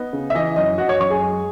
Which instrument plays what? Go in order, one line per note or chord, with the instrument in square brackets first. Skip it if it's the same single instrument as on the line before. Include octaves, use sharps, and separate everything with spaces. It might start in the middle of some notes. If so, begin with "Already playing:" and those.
Already playing: [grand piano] B3 D#4
C#3
E5
E3 D#4 D#5
F#2 D#4 D#5
F#2 F#4 F#5
C#5 C#6
F#2 C#5 C#6
G#4 G#5
G#3